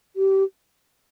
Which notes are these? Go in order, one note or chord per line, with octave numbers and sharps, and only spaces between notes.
G4